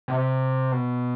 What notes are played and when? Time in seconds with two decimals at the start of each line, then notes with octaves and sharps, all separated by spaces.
0.08 C3
0.72 B2